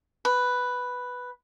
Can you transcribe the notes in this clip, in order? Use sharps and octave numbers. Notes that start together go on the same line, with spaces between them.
B4